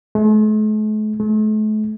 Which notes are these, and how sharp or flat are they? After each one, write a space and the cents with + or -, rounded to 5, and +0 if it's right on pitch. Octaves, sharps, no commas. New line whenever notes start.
A3 -45
A3 -40